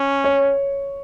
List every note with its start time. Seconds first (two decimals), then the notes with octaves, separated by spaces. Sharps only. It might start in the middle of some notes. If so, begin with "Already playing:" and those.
Already playing: C#4
0.24 C#5